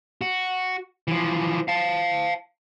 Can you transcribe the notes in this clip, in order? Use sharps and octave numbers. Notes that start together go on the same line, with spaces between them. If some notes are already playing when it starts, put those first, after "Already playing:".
F#4
E3 F3
F5 A5